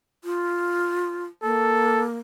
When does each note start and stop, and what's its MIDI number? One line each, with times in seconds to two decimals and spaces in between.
0.24 1.25 65
1.43 2.16 58
1.43 2.05 69